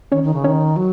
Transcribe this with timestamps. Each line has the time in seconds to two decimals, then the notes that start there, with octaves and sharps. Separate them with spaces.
0.12 D#3 C#4 C#5
0.23 D#3
0.34 C#3
0.44 D#3 C#4 C#5
0.76 F#3